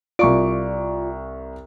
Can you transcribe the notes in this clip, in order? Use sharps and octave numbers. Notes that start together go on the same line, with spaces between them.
C2 F4 D5 C#6 D7